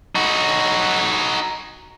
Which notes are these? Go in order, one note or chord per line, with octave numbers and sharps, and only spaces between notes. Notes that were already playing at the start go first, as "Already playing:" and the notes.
D#4 F#4